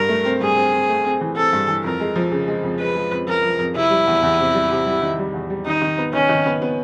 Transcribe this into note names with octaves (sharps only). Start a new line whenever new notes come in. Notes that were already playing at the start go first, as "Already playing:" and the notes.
Already playing: G2 A#4
A3
C4
G2 G#4
C4
C4
A3
C4
E3
C4 A4
G2
E3
F2 A#4
G#3
F3
C#3
G#3
F2
G#3 B4
G#3
F2
F3 A#4
F3
F2
C3 E4
G3
E2
E2
C3
G3
C3
G3
D#3
G3
E2
G3
D#3 D#4
D#3
B3
D#3 C#4
D#3
B3
B3